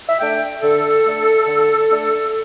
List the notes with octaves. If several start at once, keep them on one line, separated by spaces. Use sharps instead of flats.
E5
A3 D4 G5
D3 A4
A3 D4
D3
A3 D4